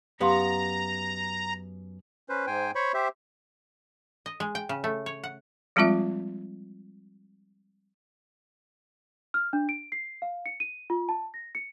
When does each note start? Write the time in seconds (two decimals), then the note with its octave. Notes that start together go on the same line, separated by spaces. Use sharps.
0.20 F#2 B3 G4 F5 A#5 C6
2.29 C#4 B4 C5
2.47 G#2 C5 G5 G#5
2.75 C5 C#5 B5 C#6
2.94 G4 C5 E5
4.26 D#5
4.40 G#3
4.55 G5
4.69 C#3
4.84 A3
5.06 C#5
5.24 F#5
5.76 F3 G3 G#3 C4 F4 E5
9.34 F6
9.53 D4
9.69 D7
9.92 C7
10.22 F5
10.46 C#7
10.60 D#7
10.90 F4
11.09 A5
11.34 A#6
11.55 C#7